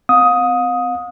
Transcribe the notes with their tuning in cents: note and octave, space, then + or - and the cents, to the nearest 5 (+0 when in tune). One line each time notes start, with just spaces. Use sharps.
C4 -30 F5 +45 D#6 +10